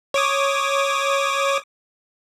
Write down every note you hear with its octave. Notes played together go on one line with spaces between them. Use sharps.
C#5 D6 D#6